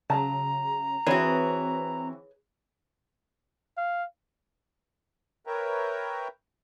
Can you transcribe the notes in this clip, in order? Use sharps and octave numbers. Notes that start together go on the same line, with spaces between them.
C#3 F#3 A5 A#5
E3 C4 F#4 G#4 B4 C#5
F5
A#4 B4 C#5 E5 G5 A#5